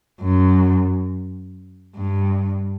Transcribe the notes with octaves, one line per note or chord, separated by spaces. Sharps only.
F#2
G2